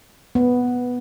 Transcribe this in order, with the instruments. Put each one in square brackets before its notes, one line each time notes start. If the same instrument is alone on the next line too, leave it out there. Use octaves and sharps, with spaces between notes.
[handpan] B3